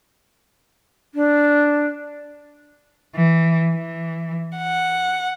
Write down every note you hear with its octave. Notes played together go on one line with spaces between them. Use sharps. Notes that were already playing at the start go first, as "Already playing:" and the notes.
D4
E3
E3
F#5